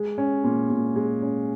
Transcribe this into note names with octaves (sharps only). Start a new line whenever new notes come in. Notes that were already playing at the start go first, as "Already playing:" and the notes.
Already playing: G#3
C#4
A#2
A#2
G#3
C#4